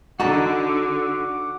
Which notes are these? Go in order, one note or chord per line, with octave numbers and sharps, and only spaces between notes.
D3 D#4 F#4 A4 F#5 B5 D6